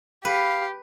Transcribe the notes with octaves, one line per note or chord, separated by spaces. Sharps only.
G4 B4 F5